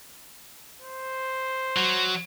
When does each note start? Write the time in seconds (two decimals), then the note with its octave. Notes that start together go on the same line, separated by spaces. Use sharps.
0.82 C5
1.77 F#3